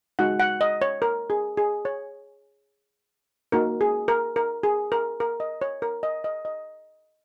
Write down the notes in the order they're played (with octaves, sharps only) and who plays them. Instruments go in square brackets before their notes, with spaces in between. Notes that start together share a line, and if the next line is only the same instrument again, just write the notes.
[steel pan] G#3 D#4 F#4 F#5
F#5
D#5
C#5
A#4
G#4
G#4
C#5
A#3 D#4 F#4 A#4
G#4
A#4
A#4
G#4
A#4
A#4
D#5
C#5
A#4
D#5
D#5
D#5